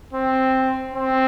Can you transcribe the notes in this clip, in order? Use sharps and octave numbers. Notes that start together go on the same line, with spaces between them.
C4
C4